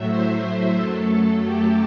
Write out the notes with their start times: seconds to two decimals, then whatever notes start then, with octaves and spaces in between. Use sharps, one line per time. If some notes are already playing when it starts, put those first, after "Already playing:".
Already playing: A2 F#3 A3 E5
0.09 C5
0.77 F#2 F#3 A3 A4
1.10 A4
1.45 G4